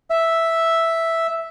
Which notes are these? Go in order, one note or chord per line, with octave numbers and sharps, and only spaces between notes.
E5